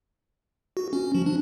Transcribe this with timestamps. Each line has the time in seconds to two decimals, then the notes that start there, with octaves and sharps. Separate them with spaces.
0.77 F#4
0.93 C#4
1.15 F3
1.26 D4